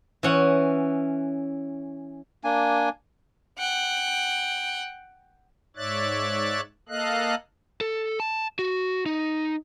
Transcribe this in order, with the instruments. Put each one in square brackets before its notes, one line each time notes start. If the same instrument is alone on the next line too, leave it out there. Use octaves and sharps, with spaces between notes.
[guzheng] E3 C#4 F#5
[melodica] A#3 D4 G#5
[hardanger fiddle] F#5 G5
[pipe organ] G#2 C#5 D5 E5 F#6 A6
A#3 A4 D#5 F5 F#6
[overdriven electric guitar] A4
A5
F#4
D#4